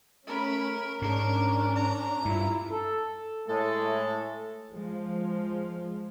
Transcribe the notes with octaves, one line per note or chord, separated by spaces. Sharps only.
A3 C#4 A#4 B5
G#2 C#4 D4 A#4
A#5
G2 E4 F4
A4
A2 G#3 A3 A4
F3 G#3